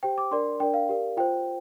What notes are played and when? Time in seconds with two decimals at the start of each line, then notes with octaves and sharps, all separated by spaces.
0.03 G4 C5 G5
0.18 D6
0.31 D4 A#4 D5 C6
0.60 D4 A#4 D5 G5
0.74 F5
0.89 G4 A#4 D5
1.17 F4 C5 G5